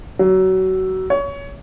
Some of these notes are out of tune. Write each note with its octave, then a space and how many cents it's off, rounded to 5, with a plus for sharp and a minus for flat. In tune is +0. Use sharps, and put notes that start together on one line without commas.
F#3 +25
C#5 +20